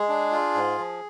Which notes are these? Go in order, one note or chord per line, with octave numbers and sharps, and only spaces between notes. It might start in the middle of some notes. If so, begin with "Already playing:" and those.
Already playing: G#3 G#4
D4
F4
G#2
F3